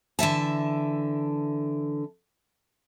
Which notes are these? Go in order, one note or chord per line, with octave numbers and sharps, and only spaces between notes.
D3 E3 E5 A5